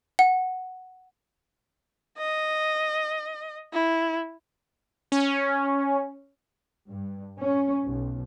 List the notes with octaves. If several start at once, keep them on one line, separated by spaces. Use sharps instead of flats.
F#5
D#5
E4
C#4
G2
C#4
B1